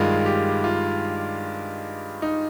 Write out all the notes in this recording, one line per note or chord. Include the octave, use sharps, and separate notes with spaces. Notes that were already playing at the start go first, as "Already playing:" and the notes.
Already playing: G2 D#3 G#3 F4
G4
F4
D#4